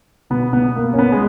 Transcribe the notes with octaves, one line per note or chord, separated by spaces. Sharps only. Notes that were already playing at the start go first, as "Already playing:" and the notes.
B2 B3
B3
A#3
C#4
B3
G#3